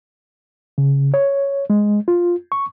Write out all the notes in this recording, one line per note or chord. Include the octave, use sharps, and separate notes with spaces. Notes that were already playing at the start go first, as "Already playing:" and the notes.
C#3
C#5
G#3
F4
C#6